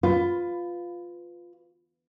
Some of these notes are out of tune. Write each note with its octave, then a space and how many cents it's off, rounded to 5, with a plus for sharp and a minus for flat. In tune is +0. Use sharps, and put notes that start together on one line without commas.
F4 +5 B4 +20